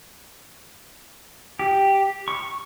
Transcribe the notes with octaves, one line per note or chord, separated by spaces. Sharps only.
G4
C#6